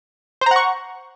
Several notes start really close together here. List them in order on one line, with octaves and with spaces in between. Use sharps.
C5 A#5 F#5 C#6